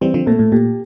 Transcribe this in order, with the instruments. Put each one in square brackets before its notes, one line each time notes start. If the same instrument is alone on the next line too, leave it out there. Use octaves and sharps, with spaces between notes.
[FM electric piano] E3 G3 [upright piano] C4
[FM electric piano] D3 F3
[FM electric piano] A#2 [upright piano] A3
[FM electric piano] A2
[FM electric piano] A#2 [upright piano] G4